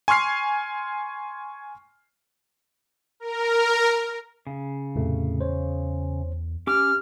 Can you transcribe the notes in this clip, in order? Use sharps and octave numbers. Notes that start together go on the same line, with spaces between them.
G#5 C6 C#6 F6 C7
A#4
C#3
E2 A2 C3 A3
C5 C#5
C#4 G4 D6 F6